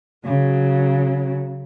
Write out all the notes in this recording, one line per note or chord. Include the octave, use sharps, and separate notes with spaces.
C#3 F#3